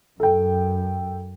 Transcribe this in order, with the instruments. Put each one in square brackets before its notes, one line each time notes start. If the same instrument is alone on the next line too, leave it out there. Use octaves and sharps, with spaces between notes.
[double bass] F#2 [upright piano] A4 G5